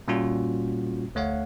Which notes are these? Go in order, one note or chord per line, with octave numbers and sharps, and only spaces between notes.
A#2 G3 A#3 C#4 F4 F#4
D2 A3 C#5 F5 F#5